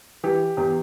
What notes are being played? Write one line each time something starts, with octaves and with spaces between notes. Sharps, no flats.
E3 G4
E2 G4